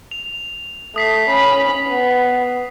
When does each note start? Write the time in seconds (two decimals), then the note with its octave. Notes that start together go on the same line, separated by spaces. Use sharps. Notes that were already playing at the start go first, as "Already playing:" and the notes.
0.11 F7
0.96 A3 D#6 B6 C7
1.30 C#4 B5
1.88 B3